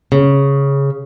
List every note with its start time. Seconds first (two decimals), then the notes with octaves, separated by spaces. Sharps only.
0.12 C#3